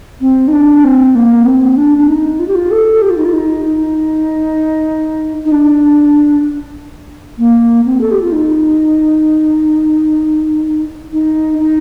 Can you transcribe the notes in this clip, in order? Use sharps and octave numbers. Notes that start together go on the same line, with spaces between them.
C4
D#4
D4
C4
A#3
C4
D4
D4
D#4
F4
G4
F4
A4
G4
F4
D#4
F4
D#4
D#4
D#4
D4
A#3
C4
A4
G4
F4
D#4
D#4
D#4